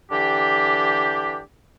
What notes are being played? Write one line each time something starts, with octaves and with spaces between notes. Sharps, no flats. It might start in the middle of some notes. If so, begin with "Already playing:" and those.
D3 E3 D4 G4